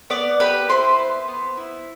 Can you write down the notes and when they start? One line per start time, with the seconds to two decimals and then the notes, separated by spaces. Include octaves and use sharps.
0.10 B3 D5 D6
0.40 G4 B4 B5
0.69 E4 C5 C6
0.99 B3
1.28 B3
1.57 E4